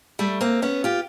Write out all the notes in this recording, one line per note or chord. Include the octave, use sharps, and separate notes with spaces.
G3 A3
A#3 C4
B3 C#4
F4 G4